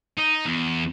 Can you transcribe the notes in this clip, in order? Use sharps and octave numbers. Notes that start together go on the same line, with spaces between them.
D#4
E2